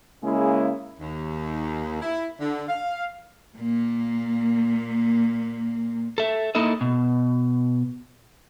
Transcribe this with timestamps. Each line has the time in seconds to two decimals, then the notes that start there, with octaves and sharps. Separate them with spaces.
0.23 C#3 G#3 A#3 C#4 E4 G#4
0.99 D#2
2.02 E4
2.39 D3
2.68 F5
3.58 A#2 A#3
6.18 A4 E5
6.55 A#3 D#4 E4 A4 D#5
6.81 B2